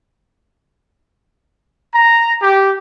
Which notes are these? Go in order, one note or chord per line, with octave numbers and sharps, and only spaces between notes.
A#5
G4